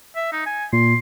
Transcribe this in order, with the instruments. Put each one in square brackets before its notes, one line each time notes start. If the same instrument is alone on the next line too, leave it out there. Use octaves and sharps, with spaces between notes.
[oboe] E5
D#4
G#5
[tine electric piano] A#2 [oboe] C6